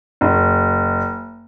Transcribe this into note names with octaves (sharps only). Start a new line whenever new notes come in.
F#1